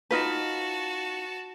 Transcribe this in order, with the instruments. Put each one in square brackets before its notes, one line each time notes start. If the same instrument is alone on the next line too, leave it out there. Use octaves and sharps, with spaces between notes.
[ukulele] D#4 F4 B4 [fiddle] F#4 A5